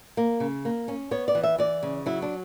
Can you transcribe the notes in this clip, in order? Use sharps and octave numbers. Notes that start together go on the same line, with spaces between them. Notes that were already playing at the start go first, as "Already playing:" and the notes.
A#3
C#3
A#3
C#4
B3 C#5
D5
E3
E5
E3 D5
C#3
F#3 E4
D4